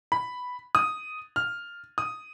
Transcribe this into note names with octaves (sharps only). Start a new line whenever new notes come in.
B5
D#6
F6
D#6